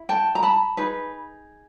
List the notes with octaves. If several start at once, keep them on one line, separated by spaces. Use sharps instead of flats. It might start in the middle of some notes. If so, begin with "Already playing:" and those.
Already playing: E4
G5 A5
A#5
A5 B5
D#4 G#4 B4